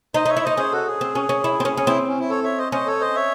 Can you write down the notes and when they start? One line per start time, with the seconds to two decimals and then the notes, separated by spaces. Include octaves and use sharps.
0.14 D#4 C5 D#5
0.26 D#4 C#5 E5
0.37 E4
0.44 D#4 C5 D#5
0.57 C#4 G#4 C5
0.71 F#4 A4
0.87 G#4
1.01 C4
1.15 C#4
1.29 C#4
1.44 E4
1.60 C4
1.65 C#4
1.77 C#4
1.87 C4 E4
2.08 C#4
2.19 E4
2.30 A4 C#5
2.44 C#5 E5
2.58 C5 D#5
2.72 C#4 C5 D#5
2.86 A4 C#5
3.01 C5 D#5
3.15 C#5 E5